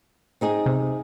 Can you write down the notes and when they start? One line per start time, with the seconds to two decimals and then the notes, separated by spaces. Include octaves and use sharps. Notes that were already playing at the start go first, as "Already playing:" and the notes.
0.41 C4 D#4 G#4
0.66 C3